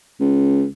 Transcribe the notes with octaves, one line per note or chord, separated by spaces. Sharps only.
C#2